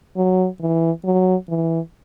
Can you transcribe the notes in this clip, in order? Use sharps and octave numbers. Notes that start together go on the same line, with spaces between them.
F#3
E3
F#3
E3